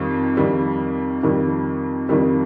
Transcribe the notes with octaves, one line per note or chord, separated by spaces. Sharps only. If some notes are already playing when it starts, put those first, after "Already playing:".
Already playing: F2 D#3 G3
F2 D#3 G3
F2 D#3 G3
F2 D#3 G3